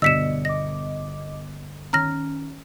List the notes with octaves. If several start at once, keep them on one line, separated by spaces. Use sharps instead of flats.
G1 B2 D5 D#5 E6 B6 C#7 E7
D#5 D6 A#6
D#3 C#4 A#5 F6 A#6